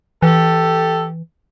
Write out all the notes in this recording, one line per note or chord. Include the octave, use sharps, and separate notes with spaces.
E3 G4 A4